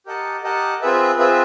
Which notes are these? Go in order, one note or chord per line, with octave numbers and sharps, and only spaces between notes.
G4 A#4 D#5 F#5 A5
G4 A#4 D#5 F#5 A5
C4 F4 G#4 B4 E5
C4 F4 G#4 B4 E5